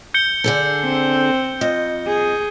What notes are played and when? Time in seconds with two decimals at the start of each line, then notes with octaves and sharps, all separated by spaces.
0.14 G6 C#7 G7
0.44 D3 G#4 A4
0.83 C4
1.61 F2 D#5
2.07 G#4